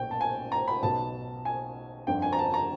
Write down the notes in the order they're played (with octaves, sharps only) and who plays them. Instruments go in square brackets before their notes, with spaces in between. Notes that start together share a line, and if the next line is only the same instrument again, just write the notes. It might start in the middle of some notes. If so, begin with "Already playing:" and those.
Already playing: [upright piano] B1 A#2 G5
A5
G#5
A#5
B5
B1 B2 A5
G#5
G1 F2 D3 G5
G#5
A#5
A5
A#5